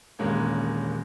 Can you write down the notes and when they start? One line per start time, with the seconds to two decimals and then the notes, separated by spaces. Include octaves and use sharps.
0.19 D#1 E2 G2 G#3 A#3 C#4